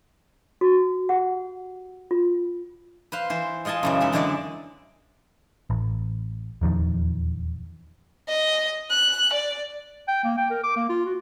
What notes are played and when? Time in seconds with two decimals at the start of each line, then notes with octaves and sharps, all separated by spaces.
0.61 F#4
1.09 G4 F#5
2.11 F4
3.12 B4 C5 F5
3.30 E3 C5
3.65 G#3 F4 D#5 G#5 A5
3.83 F#2 C#3 E3
4.01 G#3 D#4 E5
4.12 F#2 D3 E3 G#3 D5
5.70 A1
6.61 D#1 E2 D#3 F3
8.28 D#5
8.90 F#6
9.33 D5
10.08 G5
10.24 A#3
10.37 G5
10.50 A#4
10.64 D6
10.76 A#3
10.89 F4
11.05 F#4